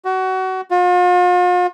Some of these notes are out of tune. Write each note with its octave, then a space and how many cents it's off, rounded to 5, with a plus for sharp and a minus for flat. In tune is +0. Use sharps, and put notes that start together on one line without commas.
F#4 +25
F4 +45